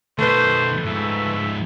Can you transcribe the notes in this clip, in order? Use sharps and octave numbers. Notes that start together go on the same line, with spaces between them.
B2 D#3 A3 B4 C5
G#2 F3 E5